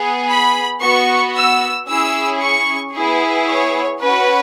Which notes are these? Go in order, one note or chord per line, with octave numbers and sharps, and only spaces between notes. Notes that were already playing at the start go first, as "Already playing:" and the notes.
Already playing: B3 G#4
B5
B3 F#4 C#6
E6
C#4 E4 G#4 E6
C#6
B3 E4 G#4
C#5
C#4 F#4 B4